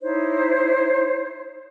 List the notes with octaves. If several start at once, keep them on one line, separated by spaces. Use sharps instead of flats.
D#4 E4 C5 C#5